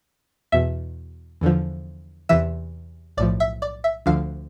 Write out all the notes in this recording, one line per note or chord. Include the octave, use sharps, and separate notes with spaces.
E2 B2 E5
E2 D3 F3
E2 C3 E3 E5
B1 A2 F3 D5
E5
D5
E5
D2 D3 F3 F5